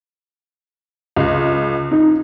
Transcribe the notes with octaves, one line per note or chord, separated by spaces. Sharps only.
C#2
D#4